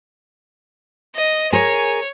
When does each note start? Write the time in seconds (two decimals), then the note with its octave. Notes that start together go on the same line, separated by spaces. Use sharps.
1.15 D#5
1.53 G#4 A#4 C#5 G#5